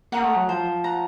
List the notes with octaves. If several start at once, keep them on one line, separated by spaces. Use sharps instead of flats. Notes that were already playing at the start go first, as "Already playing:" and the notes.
A#3 F#5 A#5 D#6
A3
F#3
F3 C5
F#5 A#5